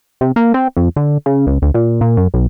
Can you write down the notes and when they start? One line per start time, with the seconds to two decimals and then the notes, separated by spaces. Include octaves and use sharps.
0.21 C3
0.36 A#3
0.54 C4
0.77 F2
0.96 D3
1.26 C#3
1.47 C#2
1.62 D2
1.74 A#2
2.01 A#2
2.17 F#2
2.34 B1